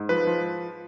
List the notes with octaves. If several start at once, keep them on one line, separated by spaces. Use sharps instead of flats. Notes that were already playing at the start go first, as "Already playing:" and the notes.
Already playing: G#2
F3 B4
F3